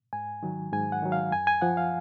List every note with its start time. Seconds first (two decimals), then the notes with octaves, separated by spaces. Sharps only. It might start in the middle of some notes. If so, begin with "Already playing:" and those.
0.13 G#2 G#5
0.43 D#3 F#3
0.72 G#2 G#5
0.92 F#5
1.02 D#3 F#3
1.12 F5
1.32 F#2 G#5
1.47 G#5
1.62 F3 F#5
1.77 F5